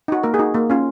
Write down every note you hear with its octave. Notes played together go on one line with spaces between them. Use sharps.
D#4 F#4
A#3 A#4
G#4
D#4 F#4
A#3
C#4 F4